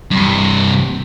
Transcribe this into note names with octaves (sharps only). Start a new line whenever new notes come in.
G2 C3